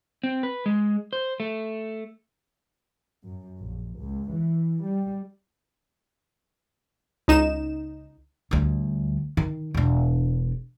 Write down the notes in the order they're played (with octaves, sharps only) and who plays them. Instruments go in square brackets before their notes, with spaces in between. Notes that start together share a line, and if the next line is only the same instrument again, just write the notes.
[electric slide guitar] C4
B4
G#3
C5
A3
[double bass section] F#2
A#1
C#2
E3
G3
[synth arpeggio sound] C#2 D#4 E7
[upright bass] D2 G3
D#3
E1 D4